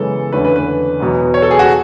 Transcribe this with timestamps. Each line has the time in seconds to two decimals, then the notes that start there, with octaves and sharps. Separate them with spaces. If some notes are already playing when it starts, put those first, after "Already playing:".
Already playing: F#2 C#3 E3 G#3 B3 A4
0.32 E2 D3 A3 C#4 B4
0.45 B4
0.56 B4
1.00 E2 B2 F#3 B3
1.34 C#5
1.42 A4
1.51 G#4
1.59 F#4